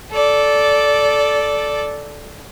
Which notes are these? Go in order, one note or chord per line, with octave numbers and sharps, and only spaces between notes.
A4 D5